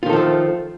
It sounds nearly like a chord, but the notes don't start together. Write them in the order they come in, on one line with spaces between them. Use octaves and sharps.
F4 D#3 A4 F3 A3